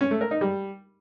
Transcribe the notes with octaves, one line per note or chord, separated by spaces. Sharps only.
C#4
A3
A#4
D#4
G3